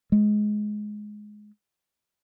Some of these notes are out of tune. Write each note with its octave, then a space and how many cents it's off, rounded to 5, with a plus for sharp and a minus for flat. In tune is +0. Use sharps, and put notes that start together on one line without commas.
G#3 +15